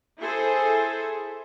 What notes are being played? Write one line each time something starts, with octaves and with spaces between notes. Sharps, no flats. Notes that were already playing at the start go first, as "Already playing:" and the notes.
E4 G#4 A4 C5